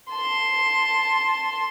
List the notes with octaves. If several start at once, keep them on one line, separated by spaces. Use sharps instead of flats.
A5 C6